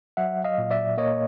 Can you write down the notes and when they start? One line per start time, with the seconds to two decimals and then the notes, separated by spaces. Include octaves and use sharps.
0.17 F#3 E5 F#5
0.44 D#5 F5
0.58 A#2
0.71 D5 E5
0.98 A#3 C#5 D#5